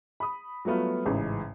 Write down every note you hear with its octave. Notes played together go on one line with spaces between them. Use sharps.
B5 D#6
F#3 G3 A3 B3 F4
A1 G#2 C#3 E3